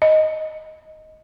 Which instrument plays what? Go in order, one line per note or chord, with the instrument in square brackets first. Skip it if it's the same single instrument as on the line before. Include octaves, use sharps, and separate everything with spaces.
[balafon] D#5